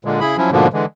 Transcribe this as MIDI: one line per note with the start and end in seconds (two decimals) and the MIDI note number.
0.05 0.20 46
0.05 0.20 50
0.05 0.20 56
0.20 0.37 49
0.20 0.37 64
0.20 0.37 68
0.20 0.37 83
0.37 0.50 53
0.37 0.50 54
0.37 0.50 61
0.37 0.50 64
0.52 0.67 44
0.52 0.67 47
0.52 0.67 50
0.52 0.67 53
0.52 0.67 58
0.73 0.85 50
0.73 0.85 52
0.73 0.85 56